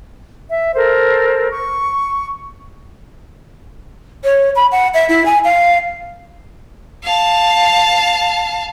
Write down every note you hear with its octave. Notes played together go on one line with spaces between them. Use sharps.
E5
A4 A#4 C5
C#6
C#5
B5
F#5
E5
E4
G#5
F5
F5 A5